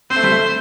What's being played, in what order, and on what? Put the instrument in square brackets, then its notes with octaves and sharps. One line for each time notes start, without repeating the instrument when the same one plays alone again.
[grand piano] C4 [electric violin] C5
[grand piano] A3
G3
A3